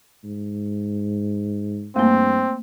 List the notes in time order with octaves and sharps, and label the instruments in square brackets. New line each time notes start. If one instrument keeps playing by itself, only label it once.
[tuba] G#2
[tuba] G2 [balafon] A3 A#3 [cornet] C4